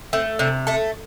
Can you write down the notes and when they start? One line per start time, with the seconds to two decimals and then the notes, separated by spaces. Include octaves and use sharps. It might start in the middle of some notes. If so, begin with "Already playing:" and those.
0.13 A3 C4
0.39 C3 D4
0.67 A3 A4